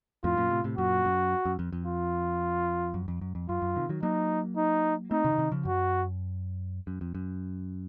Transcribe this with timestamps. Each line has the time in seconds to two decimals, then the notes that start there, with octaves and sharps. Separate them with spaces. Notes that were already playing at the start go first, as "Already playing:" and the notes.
0.24 F2 A2 F4
0.37 F#2 A#2
0.51 A2 C3
0.64 A2 C3
0.77 F#2 A#2 F#4
1.05 F#2
1.46 F#2
1.59 F2
1.73 F2
1.86 F4
2.94 F#2
3.08 F2
3.21 F#2
3.35 F2
3.49 F#2 F4
3.62 F#2
3.76 C3 D#3
3.89 D#3 F#3
4.03 F#3 A#3 D#4
4.57 D#4
5.11 A3 C4 D#4
5.25 C3 D#3
5.32 C#3
5.38 C3 D#3
5.52 C#3 F3
5.65 F#2 F#4
6.87 F#2
7.01 F2
7.15 F#2